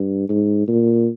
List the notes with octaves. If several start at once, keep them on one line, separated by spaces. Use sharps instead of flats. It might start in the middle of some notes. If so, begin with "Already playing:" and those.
Already playing: G2
G#2
A#2